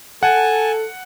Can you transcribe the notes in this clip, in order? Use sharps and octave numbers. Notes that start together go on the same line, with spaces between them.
A4 F#5 G#5 A5